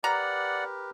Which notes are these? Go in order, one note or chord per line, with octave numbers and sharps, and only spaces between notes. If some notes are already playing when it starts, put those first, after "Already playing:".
G4 A#4 B4 D5 F#5 A#5